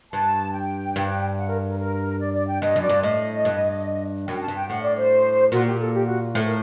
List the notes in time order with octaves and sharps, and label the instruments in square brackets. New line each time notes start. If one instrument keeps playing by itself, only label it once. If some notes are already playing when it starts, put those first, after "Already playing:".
[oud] G2 [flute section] A5
[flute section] G5
[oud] G2
[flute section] F#5
A#4
A#4
A#4
D5
D5
G5
[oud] G2 [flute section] D#5
[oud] F#2
[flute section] D5
[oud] G2
[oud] A2 [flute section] D#5
[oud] G2
[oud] F#2 [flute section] G5
[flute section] A5
[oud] G2
[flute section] G5
[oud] A2 [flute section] F#5
[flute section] D5
C5
[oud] A#2 [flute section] F#4
[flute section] G4
A4
G4
F#4
[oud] A2 [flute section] A4
[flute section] A#4